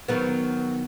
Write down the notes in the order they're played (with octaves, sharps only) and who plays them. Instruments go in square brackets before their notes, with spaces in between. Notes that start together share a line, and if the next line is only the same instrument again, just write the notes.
[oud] D#3 F#3 B3